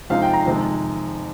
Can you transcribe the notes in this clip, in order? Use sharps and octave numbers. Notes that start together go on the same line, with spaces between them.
F2 C3 F3 G#3 D#4 F5
G5
A#5
F2 C3 D#3 G#3